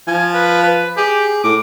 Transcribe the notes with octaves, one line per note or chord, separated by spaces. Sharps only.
F3 G#5
B4
B4
G4 G#4
A2 D6